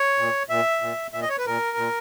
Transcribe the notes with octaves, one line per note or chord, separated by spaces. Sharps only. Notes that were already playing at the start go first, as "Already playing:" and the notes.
Already playing: C#5
A#2
A#2 E5
A#2
A#2 E5
D#5
C#5
B4
A#2 A#4
A#2